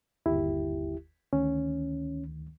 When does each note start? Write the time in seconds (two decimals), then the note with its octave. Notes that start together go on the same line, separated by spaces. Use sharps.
0.26 G1 D#2 E4 G4
1.33 D2 D#3 C#4